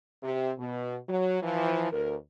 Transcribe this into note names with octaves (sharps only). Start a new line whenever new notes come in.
C3
B2
F#3
E3 F3
D2 A#4